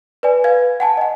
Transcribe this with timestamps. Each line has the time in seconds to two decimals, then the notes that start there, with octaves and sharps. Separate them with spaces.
0.23 B4 D5 G#5
0.44 B4 F5 G#6
0.80 F#5 G#5 A5
0.97 D#5 F#5